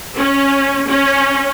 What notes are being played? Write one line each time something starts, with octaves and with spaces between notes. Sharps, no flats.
C#4
C#4